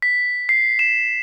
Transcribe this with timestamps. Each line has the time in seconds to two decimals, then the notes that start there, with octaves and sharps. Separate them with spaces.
0.02 B6
0.49 C7
0.79 E7